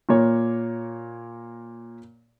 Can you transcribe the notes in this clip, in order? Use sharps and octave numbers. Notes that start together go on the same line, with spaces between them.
A#2 A#3 C#5